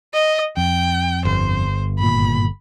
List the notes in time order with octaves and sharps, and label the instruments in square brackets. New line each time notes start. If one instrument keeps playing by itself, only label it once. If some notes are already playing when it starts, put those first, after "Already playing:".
[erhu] D#5
[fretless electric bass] F2 [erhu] G5
[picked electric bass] G1 [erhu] C5
[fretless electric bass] G#1 A#2 [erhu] B5